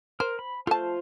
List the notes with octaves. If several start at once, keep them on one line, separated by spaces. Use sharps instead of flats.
A#4 C5
B5
A3 F4 C5 A5